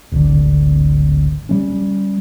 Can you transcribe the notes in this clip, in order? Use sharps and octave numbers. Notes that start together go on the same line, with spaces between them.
D1 G#1 D3
G3 G#3 C#4